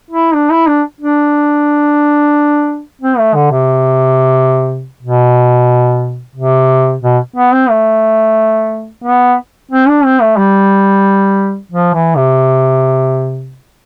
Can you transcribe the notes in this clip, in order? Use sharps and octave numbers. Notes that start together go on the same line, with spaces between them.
E4
D4
E4
D4
D4
C4
A3
D3
C3
B2
C3
B2
B3
C4
A3
B3
C4
D4
C4
A3
G3
F3
E3
C3